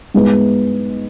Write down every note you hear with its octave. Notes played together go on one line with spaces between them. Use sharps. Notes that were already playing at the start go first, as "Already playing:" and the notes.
G#2 G#3 B3